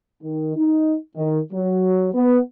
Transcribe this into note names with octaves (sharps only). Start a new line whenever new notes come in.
D#3
D#4
D#3
F#3
B3